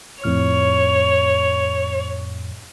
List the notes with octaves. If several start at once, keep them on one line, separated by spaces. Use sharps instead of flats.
F2 A2 C#5 F6